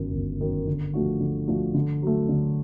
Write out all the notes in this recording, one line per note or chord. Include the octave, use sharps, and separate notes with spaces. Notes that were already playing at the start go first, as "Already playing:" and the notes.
Already playing: G1 F#2 D#3
G1
F#2 D#3
D3
F3 A3 D4 F#4
D3
F3 A3 D4 F#4
D3
F#3 A3
D3